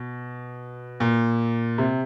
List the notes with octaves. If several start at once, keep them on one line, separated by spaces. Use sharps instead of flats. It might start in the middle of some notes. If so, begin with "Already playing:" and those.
Already playing: B2
A#2
C3